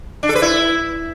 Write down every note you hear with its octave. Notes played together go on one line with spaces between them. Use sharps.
D4
A4
B4
E4